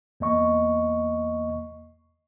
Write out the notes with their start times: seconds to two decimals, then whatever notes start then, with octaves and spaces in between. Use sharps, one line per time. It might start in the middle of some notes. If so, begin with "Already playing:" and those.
0.20 E2 A#3 D#5 C#6